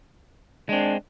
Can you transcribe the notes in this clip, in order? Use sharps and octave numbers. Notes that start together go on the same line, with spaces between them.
G#3 C4 D4